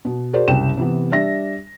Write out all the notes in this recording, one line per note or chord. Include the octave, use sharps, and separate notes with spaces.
B2
F#4 G#4 A#4 C5 D5
F#1 C2 G5 E7
C3 E3 B3
G3 D4 E5 A#6